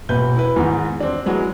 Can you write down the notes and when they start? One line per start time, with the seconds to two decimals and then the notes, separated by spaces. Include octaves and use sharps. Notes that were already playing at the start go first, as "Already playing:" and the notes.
0.09 E1 A#2 B4 G6
0.36 E4 B4
0.56 E2 G#2 D#3 E3
1.00 C4 D4
1.26 E3 F#3 G#3 B3